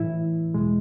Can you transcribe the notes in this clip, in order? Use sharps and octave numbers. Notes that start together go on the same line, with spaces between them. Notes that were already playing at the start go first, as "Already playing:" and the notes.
Already playing: A2 E3 E4
E2 B2 G#3